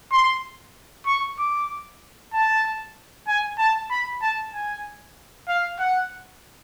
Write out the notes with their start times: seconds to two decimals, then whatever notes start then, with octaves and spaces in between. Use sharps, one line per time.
0.12 C6
1.06 C#6
1.39 D6
2.33 A5
3.28 G#5
3.59 A5
3.90 B5
4.22 A5
4.54 G#5
5.48 F5
5.79 F#5